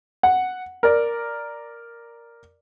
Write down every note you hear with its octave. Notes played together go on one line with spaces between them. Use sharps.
F#5
A#4 D5